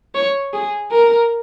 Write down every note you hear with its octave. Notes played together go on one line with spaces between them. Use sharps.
C#5
G#4
A#4